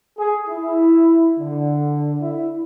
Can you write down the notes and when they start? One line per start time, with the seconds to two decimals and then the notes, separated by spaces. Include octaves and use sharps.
0.18 G#4
0.49 E4
1.39 D3
2.21 E4